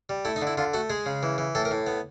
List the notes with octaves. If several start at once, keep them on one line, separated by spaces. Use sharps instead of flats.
G3
A3 E4
D#4
D3
E4
D3 F4
A3 F#4
G#3 G#4
C#3
E3
E3
A2 A4
A#4
A2
B3